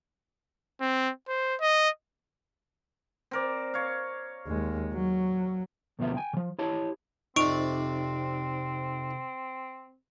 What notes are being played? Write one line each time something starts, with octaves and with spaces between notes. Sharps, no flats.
C4
C5
D#5
C4 A#4 D5
C#5 F5
D#2 G#3
F#3
D2 B2 F3 B3 E5
G5 G#5
C#3 F3
E4 G4 C#5 A5
F2 C3 C4 D#4 D5 C#6 D7 F7